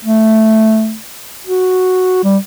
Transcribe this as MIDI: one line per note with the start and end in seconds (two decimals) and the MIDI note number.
0.05 0.95 57
1.46 2.24 66
2.24 2.37 55